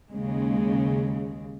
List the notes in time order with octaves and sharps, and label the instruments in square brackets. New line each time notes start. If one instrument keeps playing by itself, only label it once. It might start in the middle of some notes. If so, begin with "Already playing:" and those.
[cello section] D#2 C#3 G#3